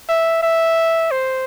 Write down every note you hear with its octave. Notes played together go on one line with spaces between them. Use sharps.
E5
E5
C5